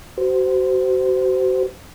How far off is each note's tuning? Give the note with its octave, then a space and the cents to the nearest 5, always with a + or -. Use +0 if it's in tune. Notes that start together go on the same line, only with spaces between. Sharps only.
F#4 +35 C5 -25